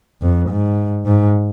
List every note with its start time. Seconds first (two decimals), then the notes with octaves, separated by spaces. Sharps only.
0.22 F2
0.50 G#2
1.06 G#2